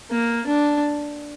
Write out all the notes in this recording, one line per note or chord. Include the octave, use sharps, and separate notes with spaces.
A#3
D4